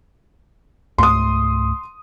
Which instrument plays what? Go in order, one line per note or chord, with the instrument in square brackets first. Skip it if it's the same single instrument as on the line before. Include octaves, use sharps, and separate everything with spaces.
[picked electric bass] C#2 G#2 A3 [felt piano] C6 D#6